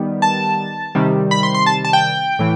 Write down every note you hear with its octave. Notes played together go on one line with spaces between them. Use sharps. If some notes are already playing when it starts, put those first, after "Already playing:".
Already playing: D#3 G3 B3
A5
C3 D#3 G3
B5
C6
C6
A5
A5
G5
A2 E3